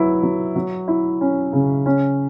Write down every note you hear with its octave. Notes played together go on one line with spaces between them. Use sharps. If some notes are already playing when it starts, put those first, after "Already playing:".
Already playing: F#3 B3 E4
F#3
F#3
E4
C#4
C#3
C#4